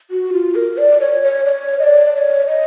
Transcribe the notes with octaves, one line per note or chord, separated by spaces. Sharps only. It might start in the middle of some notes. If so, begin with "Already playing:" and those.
F#4
F4
A#4
D5
C#5
C#5
D5
C#5
D#5
D5
D5
C#5
D#5